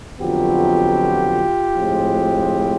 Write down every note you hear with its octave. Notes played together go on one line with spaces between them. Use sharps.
F2 D3 F#3 B3 F4 G4
A2 F3 G#3 C4